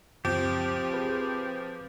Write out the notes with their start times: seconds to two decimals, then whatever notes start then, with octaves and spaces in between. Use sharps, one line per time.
0.25 C#2 F#2 F3 C4 G4
0.94 G#4 B4